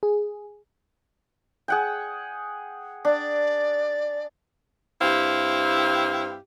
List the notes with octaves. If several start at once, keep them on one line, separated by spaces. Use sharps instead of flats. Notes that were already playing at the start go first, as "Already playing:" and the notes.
G#4
G#4 F#5 G5
D4 D5
G2 C4 E4 G4 F5